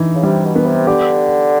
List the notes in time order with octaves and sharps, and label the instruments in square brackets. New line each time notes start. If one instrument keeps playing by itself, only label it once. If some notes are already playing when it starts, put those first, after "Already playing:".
Already playing: [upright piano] E3 D#4
[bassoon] C#3
[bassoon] C3 [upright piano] G3
[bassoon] B2
[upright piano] B3
[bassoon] C3
[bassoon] D3 [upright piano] G4